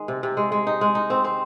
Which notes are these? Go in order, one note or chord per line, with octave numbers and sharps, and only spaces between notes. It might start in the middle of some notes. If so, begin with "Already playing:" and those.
Already playing: D#3 G#3
C3
C3
G#3
G#3
D#4
G#3
D#4
C4
C4